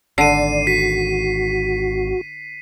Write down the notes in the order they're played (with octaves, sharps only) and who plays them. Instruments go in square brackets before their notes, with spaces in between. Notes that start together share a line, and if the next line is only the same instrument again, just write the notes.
[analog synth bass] G#1 [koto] D3 [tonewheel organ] D5 [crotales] C7 D#7
[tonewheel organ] F#4 [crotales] B6